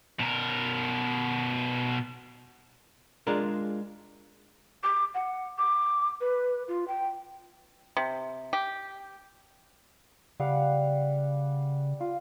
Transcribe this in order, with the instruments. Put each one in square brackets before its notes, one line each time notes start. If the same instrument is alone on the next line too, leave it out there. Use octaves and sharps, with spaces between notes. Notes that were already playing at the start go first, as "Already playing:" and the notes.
[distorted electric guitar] B2 A#4
[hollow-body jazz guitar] G#3 D4 F4 G#4 A#4
[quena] D6
F#5
D6
B4
F4
G5
[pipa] C3
G4
[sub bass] C#3 [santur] G3 F5 F#5
[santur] F4